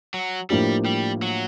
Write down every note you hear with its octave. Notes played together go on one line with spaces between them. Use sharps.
F#3
A2 F3 G3 A#3 D4 G4
G3
F#3